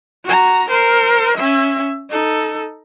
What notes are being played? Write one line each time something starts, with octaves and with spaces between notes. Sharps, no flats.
F#4 A#5
A#4 C5
C#4 E5
D#4 A4